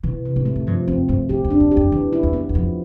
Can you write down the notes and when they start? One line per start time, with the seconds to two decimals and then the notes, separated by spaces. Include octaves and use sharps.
0.04 B2 E3
0.25 C3
0.36 A2
0.45 A3
0.56 A2
0.67 G2 F3
0.88 F2 C4
1.09 G2 A3
1.29 A2 G4
1.44 F2
1.50 D4
1.60 E2
1.71 G4
1.77 F2
1.92 F2 E3
2.13 E4
2.23 E2
2.33 B3
2.49 E2
2.55 F2 F3